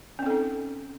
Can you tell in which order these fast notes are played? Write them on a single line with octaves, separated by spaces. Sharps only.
C#4 C4 A4 D#4